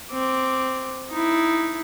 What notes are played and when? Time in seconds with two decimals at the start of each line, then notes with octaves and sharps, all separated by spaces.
0.12 C4 D6
1.11 D#4 E4